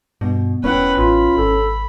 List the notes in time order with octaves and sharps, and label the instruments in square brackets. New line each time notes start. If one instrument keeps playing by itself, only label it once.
[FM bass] G2 [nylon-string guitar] B2
[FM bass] E1 [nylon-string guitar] C#4 E4 G5 [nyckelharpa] B4 F#5
[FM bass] A1 [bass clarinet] F4 [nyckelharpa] B5
[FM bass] G#1 [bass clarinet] A4